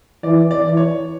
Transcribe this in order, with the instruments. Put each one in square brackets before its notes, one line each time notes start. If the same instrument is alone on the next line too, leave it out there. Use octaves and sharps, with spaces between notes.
[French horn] E3 [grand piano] D5
[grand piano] D5
[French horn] E3
[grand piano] C#5